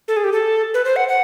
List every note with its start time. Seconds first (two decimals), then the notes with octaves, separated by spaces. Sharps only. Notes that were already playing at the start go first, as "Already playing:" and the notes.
0.08 A4
0.17 G#4
0.24 G4
0.33 A4
0.74 B4
0.85 C5
0.96 F#5
1.08 F#5